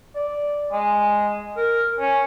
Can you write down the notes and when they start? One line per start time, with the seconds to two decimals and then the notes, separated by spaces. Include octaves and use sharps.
0.16 D5
0.72 G#3
1.57 A#4
2.00 C#4